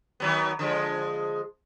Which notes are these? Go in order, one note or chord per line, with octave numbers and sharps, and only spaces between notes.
D#3 F#3 B3
D3 F3 G#3